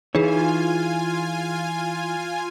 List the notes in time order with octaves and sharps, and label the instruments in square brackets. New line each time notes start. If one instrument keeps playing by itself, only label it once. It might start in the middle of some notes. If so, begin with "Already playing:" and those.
[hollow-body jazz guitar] E3 C#5 [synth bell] D#4 G#4 [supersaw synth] F4 G#5